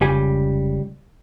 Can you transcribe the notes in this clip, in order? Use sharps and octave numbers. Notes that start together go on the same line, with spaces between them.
F1 C#2 C#3 G3 G#5